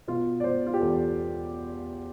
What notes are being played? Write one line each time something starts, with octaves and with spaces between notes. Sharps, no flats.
B2 F4
D5
B2 C5
F4
G4
E2 A4